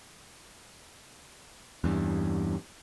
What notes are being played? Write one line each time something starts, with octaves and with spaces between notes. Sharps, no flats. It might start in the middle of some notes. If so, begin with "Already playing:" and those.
E2 G2